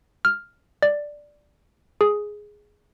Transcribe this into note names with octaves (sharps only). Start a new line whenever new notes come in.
F6
D5
G#4